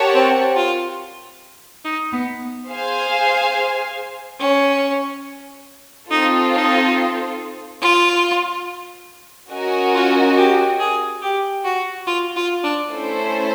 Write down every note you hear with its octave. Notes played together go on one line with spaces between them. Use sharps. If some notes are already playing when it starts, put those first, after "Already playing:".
Already playing: G4 A#4 C#5 F#5 A5
C4
F4
D#4
B3
G#4 C5 F5 G#5
C#4
C4 D#4 F4 A4
D#4
F4
C#4 F#4 A#4 D#5 G#5
F4
G4
G#4
G4
F#4
F4
F4
D4
A3 C#4 E4 A4 C5